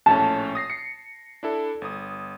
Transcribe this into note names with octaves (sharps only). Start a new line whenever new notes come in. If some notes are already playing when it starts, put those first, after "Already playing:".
A#1 A2 C#4 A5
D#6 A#6 C7
C7 C#7
D4 E4 A4
G1 D#6